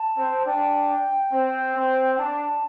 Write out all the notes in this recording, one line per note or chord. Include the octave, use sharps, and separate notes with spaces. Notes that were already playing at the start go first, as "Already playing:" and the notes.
Already playing: A5
C4
D4 G5
C4
C4
G5
D4 A5